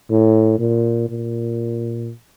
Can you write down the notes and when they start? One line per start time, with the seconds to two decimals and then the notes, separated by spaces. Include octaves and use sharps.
0.10 A2
0.59 A#2
1.10 A#2